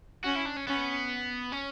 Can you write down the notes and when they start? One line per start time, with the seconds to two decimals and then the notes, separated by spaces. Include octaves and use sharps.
0.24 C#4 F#4
0.36 E4
0.46 D4
0.57 C#4
0.67 B3 C#4
1.52 C#4